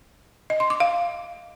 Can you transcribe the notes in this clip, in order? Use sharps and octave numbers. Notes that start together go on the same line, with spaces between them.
D#5
C6
D6
F5